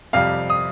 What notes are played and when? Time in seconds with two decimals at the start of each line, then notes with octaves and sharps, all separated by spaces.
0.13 F2 C3 G3 F5
0.50 D#6